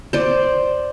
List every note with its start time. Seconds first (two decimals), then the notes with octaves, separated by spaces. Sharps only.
0.13 C5 D5